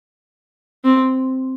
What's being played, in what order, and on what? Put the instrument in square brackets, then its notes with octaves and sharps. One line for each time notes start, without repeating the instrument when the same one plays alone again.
[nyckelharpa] C4